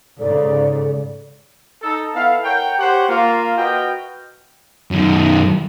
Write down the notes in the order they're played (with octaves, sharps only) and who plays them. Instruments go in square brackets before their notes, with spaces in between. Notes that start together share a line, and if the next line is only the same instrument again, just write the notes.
[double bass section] G#2 C#3 [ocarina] A4 [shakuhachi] D5
[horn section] D#4 A4
B3 E4 A4 F5
A#4 C#5 F#5 G5
G4 C5 C#5 F#5
A#3 F4
F#4 A#4 B4 D#5 G5
[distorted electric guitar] F#2 D#3